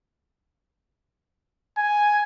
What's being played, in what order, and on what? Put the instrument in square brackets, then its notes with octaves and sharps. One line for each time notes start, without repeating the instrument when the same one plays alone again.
[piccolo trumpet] G#5